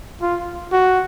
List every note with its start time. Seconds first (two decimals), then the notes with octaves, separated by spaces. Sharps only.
0.21 F4
0.72 F#4